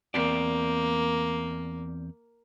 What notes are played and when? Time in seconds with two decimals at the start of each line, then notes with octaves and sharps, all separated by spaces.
0.14 E2 A#3 C4 D5